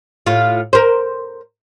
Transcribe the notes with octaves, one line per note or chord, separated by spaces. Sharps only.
A2 F4
A#4 C5